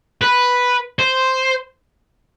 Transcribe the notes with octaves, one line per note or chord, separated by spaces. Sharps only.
B4
C5